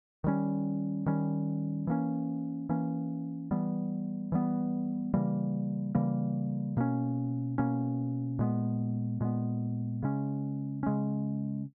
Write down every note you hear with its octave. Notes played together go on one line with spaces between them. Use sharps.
D#3 G3 C#4
D#3 G3 C#4
E3 A#3 C#4
E3 A#3 C#4
E3 G3 B3
E3 G3 B3
C#3 E3 G3 A#3
C#3 E3 G3 A#3
B2 A#3 C#4
B2 A#3 C#4
A#2 G#3 B3
A#2 G#3 B3
C#3 G#3 C#4
C#3 G#3 C#4